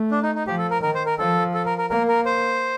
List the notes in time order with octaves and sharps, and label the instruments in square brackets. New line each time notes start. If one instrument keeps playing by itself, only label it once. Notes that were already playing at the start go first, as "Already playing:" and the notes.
Already playing: [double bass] A3
[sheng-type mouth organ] D4
D#4
D#4
[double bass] F3 [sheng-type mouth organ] G4
[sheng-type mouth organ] A4
A#4
[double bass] D#3 [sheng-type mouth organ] A#4
[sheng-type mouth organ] C5
A#4
[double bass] F3 [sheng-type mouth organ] A4
[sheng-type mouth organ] A4
A#4
A#4
[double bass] A#3 [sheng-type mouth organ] A#4
[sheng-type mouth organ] A#4
C5